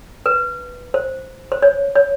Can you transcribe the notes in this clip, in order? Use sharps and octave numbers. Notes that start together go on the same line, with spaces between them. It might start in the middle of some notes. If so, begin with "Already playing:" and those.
B4
C5
C5
C#5
C#5